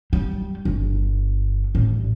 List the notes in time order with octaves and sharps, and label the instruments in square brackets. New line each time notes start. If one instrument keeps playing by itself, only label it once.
[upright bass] G3
G1
A1